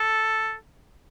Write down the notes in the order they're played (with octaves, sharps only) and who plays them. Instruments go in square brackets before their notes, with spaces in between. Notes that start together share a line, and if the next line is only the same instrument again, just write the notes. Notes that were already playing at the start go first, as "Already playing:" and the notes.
Already playing: [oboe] A4